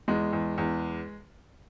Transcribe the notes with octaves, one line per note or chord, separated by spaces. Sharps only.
E2 G#3
E2
E2